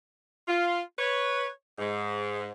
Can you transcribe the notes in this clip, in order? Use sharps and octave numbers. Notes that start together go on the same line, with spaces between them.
F4
B4 C#5
G#2